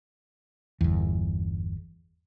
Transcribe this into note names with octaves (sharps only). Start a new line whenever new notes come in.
G1 E2